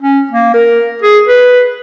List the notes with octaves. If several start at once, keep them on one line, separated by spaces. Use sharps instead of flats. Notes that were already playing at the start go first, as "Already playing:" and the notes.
C#4
A#3
A#4
G#4
B4